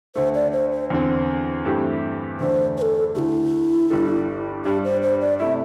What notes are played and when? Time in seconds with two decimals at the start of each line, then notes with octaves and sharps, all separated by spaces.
0.15 D2 D3 A3 C5
0.34 D5
0.53 C5
0.72 C5
0.90 E2 D3 C4
1.65 G2 E3 A3 C4 G4
2.40 E2 D3 A3 D4 C5
2.77 C5
2.82 A4
3.15 D2 D3 A3 E4 G4
3.90 G1 G2 G3 D4 A4
4.65 G2 G3 D4 G4
4.84 C5
5.03 C5
5.21 D5
5.40 C3 A3 E4 E5